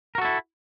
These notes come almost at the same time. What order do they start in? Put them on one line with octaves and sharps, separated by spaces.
A#4 F#4 A4 E4